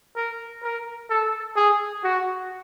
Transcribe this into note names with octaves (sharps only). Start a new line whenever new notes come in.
A#4
A#4
A4
G#4
F#4